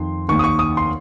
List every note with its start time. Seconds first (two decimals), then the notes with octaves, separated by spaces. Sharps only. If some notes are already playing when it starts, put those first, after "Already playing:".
Already playing: F2 D#3 C6
0.28 D#2 D#3 C#6
0.39 D#6
0.44 C#6
0.59 D#6
0.77 C6